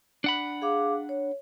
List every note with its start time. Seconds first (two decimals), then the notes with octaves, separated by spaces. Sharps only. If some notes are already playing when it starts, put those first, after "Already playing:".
0.24 D4 F#5 B5
0.62 G#4 F5 D6
1.09 C#5